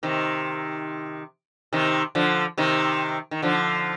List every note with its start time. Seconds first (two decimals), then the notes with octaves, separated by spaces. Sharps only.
0.03 C3 D#3
1.73 C3 D#3
2.15 D3 F3
2.58 C3 D#3
3.31 D#3
3.42 D3 F3